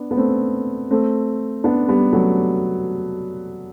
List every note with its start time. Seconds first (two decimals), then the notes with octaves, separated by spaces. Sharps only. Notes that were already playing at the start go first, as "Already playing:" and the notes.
Already playing: B3 D4
0.11 B3
0.17 A3 C4
0.91 A3 C4
1.64 B3 D4
1.88 G3 B3
2.13 F#3 A3